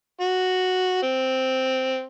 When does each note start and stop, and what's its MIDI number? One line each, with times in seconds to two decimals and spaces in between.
0.21 0.99 66
1.03 2.03 60